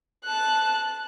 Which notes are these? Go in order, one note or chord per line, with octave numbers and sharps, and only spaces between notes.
A5 F#6